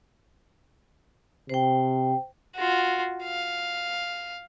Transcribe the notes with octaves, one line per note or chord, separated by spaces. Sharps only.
C3 C5 G5
F4 F#4
F5